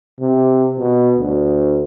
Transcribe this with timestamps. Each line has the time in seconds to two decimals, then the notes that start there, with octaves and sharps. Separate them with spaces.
0.20 C3
0.79 B2
1.18 D2